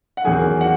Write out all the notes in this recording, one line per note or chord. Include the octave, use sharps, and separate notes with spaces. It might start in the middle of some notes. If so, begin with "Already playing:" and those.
F#5
E2 D#3 F#3 G#4 G#5
F#4 F#5